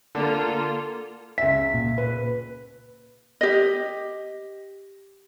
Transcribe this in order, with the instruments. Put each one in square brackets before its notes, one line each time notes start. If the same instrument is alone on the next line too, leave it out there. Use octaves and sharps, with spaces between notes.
[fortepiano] D3 [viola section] A#3 F4 A4
[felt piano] C#2 E5 [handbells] B6
[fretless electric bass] A#2
[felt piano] B4
[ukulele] G4 D#5